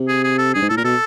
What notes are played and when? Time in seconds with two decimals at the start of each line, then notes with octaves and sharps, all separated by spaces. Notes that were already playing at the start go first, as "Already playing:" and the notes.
Already playing: C3
0.08 G#4
0.24 G#4
0.38 A4
0.54 G2 G#4
0.62 G#2
0.69 A2 A4
0.77 A#2 A#4
0.84 B2 A4